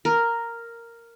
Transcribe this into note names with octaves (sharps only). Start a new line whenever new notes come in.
A#4